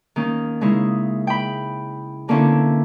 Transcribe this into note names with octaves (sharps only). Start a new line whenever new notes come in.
D#3 A#3 C#4
C#3 G#3 D#4 E4
G5 B5
B2 D3 A#3 C4 C#4 E4